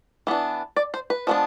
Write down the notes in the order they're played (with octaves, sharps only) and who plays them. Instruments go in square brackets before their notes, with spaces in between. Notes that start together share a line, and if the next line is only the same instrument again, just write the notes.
[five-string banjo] E3 B3 D4
D5
C5
B4
F3 G#3 B3 D4